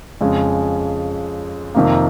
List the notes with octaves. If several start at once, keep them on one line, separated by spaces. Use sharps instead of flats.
F2 C#3 G#3
F2 C3 D#3 A#3